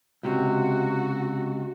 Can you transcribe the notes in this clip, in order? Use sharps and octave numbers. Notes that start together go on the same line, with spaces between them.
C#2 C3 F#4